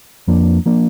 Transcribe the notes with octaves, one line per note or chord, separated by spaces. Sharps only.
F2 F3 A#3 D4
F3 A#3 D4